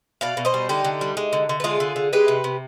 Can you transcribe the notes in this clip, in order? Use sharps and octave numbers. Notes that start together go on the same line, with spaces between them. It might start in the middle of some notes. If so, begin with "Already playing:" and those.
B2 D5 F5
B2
C5 D#5
G3
D3 D#4 G4
D3
G3
G#3
D3
D3
B4
G#3 F4 G#4
D3
D3
G#3 G4 B4
C3
C3